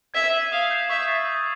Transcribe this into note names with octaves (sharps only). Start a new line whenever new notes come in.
E5 G#6
C7 D#7 F#7
F5 D#6
G6 C7 E7
E5 C#6
E6 A6 C7
D#6